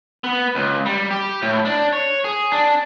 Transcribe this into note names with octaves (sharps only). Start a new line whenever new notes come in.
B3
C#2
G3
G4
A2
D4
C#5
G#4
D4